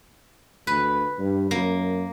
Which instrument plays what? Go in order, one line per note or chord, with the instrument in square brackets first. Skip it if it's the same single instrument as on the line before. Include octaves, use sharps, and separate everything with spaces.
[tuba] D2 [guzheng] B4
[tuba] G2
[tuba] F#2 [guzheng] A#3